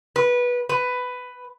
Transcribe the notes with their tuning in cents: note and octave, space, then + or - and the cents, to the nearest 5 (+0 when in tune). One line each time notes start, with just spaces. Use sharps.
B4 -15
B4 +10